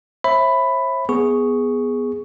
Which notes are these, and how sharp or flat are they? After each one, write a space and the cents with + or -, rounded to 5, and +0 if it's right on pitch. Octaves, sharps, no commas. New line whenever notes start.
C5 +45 E5 +0 B5 +10
B3 +0 G#4 +0 C#6 +0